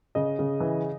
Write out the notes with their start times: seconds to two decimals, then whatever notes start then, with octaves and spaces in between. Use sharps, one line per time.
0.15 C#3 D#5
0.39 C#3
0.60 E3